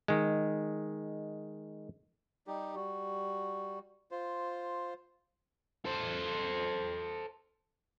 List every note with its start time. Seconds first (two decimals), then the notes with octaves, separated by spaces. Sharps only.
0.08 D#3 G#3
2.47 G3 D#4 G4
2.76 G3 F#4
4.11 F4 C5
5.85 A4 C5